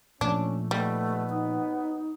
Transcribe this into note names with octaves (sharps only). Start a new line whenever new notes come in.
A#2 F3 A3 C#4 D4
D#2 B2 G3 A3 B3
D#4